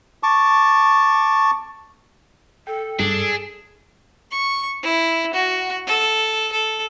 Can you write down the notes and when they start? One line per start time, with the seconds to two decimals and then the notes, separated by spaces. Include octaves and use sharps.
0.23 A5 C#6 D6
2.67 A4 G5
3.00 G2 D4 G#4
4.31 C#6
4.83 E4
5.34 F#4
5.87 A4
6.52 A4